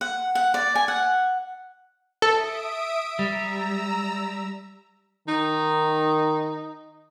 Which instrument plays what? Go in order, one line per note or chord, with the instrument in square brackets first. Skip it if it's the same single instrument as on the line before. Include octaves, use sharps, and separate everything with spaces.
[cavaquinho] F#5
F#5
D5
G#5
F#5
[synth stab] A4 [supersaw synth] E5 D#6 D7
[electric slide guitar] G3 [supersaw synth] A#5 E6
[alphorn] D#3 [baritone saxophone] D#4